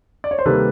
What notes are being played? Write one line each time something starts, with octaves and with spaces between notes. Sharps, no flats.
D5
C#5
C5
C3 D#3 G3 A#3 A4 B4